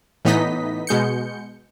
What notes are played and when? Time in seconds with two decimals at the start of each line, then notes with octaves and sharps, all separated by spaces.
0.25 A2 E3 B3 D#4 D#5 B6
0.87 B2 G#3 G6 C#7